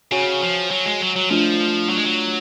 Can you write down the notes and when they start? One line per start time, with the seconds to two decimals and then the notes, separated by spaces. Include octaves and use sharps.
0.11 C#3 F#4 C#5 G#5
0.41 F3
0.70 F#3
0.85 G#3
1.01 F#3
1.16 F#3
1.30 F3 A3 D4 F4
1.89 F#3
1.97 G#3
2.04 F#3